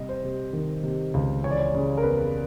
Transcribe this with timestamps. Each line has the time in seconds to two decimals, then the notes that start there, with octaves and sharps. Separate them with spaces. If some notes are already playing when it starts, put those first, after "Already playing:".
Already playing: C3 G3 D#5
0.09 C5
0.24 C3
0.53 D#3
0.83 C3
1.14 C#2
1.44 E3 C#5
1.51 D5
1.59 C#5
1.74 C#3
1.97 A#4
2.03 E2 B4